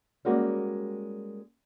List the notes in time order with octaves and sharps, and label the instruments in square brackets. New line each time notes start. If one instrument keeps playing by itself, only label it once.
[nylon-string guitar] G3 G#3 A#3 C#4 F#4